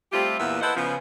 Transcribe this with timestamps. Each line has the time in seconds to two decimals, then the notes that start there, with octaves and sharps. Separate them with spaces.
0.12 G3 A3 C4 F4 G4
0.39 E2 A#2 A#3 B3 E5
0.61 E4 A4 B4 C5 D#5 F#5
0.76 C#3 F3 B3